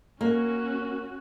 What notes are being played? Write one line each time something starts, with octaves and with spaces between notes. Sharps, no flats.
A#3 C#4 F#4